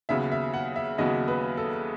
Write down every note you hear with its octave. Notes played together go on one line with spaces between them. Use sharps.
D#2 C#3 F#3 B3 E5
E5
F#5
E5
D#2 C#3 F#3 B3 D#5
B4
A4